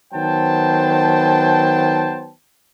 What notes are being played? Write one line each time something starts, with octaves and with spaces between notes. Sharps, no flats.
D#3 F#3 B3 C5 G5 A5